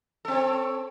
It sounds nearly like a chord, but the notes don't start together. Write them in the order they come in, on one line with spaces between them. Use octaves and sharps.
A4 C4 C#5